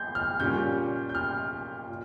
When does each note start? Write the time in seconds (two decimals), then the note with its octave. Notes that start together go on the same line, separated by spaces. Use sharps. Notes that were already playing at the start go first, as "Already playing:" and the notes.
Already playing: G6
0.15 F6
0.40 A#2 G3 C#4 G6
1.09 G6
1.15 F6
1.89 A#2